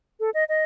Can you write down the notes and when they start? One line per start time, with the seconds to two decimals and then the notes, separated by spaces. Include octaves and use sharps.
0.20 A4
0.34 D#5
0.49 D#5